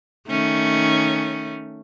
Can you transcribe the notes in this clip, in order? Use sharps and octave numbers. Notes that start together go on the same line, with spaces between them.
D#3 A3 C#4